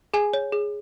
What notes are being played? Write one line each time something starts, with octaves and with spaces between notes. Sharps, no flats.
G#4 G#5
C#5
G#4